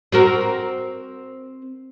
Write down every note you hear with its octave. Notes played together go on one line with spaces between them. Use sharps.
C4 F#4 A#4